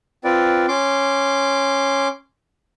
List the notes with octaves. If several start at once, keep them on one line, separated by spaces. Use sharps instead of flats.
C4 F4 B4 D5
C#4 C6 D6